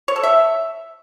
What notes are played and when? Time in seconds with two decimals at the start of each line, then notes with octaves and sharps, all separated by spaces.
0.08 C#5
0.16 A4
0.23 E5